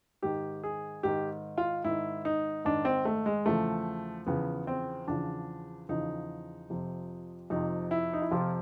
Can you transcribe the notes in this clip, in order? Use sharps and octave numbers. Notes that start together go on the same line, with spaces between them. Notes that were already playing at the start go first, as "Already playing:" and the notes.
G#2 D#3 G4
G#4
G#2 D#3 G4
F4
G#2 D#3 E4
D#4
G#2 D#3 D4
C4
A3
G#3
E2 C#3 F3 A3
E2 C#3 F3 B3
C4
E2 C#3 F3 D4
E2 C#3 F3 D#4
F2 C3 F3
F2 C3 F3 D#4
E4
D#4
E4
F2 C3 F3 F4